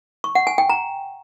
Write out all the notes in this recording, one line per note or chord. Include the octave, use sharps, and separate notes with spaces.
C#6
F#5
G#5
G5
A#5